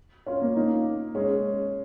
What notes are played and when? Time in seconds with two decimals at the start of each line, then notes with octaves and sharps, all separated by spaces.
0.26 C#4 F4
0.41 A#3
0.56 A#3 D#4
1.15 G#3 C#4